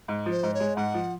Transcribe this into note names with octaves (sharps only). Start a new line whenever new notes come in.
G#2
F3
C5
G#2
C#5
G#3
G#2 F#5
F3